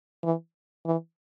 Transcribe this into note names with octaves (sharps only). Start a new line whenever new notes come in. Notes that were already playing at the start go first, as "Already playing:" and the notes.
E3
E3